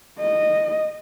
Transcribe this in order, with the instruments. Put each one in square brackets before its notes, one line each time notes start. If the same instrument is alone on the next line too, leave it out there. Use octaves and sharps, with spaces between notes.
[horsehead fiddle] D#5